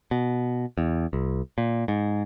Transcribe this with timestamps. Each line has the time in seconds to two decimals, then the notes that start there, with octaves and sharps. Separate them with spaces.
0.11 B2
0.78 E2
1.13 C2
1.58 A#2
1.88 G#2